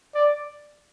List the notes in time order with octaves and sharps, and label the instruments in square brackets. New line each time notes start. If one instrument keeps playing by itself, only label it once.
[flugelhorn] D5